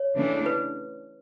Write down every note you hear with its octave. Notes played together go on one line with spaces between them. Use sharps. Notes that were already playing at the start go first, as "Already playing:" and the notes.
Already playing: C#5
C#3 E3 A3 D4
B4